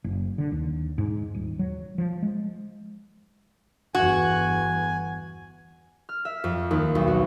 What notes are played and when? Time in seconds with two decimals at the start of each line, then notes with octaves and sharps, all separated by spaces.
0.04 F#1
0.38 D3
0.52 D#2
0.98 G#2
1.34 D#1
1.59 F#3
1.98 F3
2.23 G#3
3.95 G1 E2 F#4 G#5
6.09 F6
6.25 E5
6.44 F2
6.71 D#2
6.95 B1
7.08 F#4